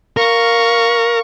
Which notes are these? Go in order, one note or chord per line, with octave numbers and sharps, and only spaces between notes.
A#4 F5 C#6